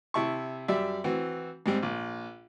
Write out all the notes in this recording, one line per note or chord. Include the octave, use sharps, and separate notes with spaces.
C3 E4 A5 C#6
F#2 G3 D5 E5
E3 C4 F#4
G#2 G3 C4
A#1